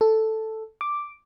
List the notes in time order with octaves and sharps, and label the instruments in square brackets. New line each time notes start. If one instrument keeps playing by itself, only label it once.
[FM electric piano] A4
D6